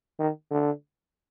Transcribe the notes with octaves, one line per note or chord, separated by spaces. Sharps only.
D#3
D3